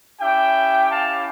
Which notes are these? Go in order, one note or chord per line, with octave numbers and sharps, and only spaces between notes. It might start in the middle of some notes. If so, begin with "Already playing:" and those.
C#4 E4 G4 E5 G5
F5 A5